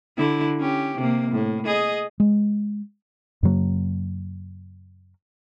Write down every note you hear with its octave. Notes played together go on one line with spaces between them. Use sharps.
D3 E4
C#4 G4
C3 A#3
A2
G#4 D#5
G#3
F#2 C#3 F#3 A#3